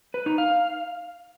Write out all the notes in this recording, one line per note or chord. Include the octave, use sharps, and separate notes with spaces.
B4
D#4
F5